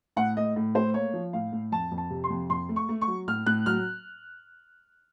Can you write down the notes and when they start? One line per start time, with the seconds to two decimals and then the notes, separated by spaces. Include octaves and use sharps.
0.17 A2 F#5
0.36 A3 D#5
0.56 A2
0.75 A3 C5
0.94 A#3 C#5
1.14 F3
1.33 A2 F5
1.53 A2
1.72 F2 A5
1.91 F2
1.98 A5
2.10 C3
2.24 C6
2.30 F2
2.50 F2 C6
2.69 A3
2.76 C#6
2.89 A3
3.01 C#6
3.08 F#3
3.28 A2 F6
3.46 A2 F#6
3.66 F#3 F6